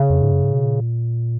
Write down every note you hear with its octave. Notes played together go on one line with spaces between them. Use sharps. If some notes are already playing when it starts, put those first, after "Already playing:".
Already playing: C#3
F2
G#2
F#2
G#2
B2
A#2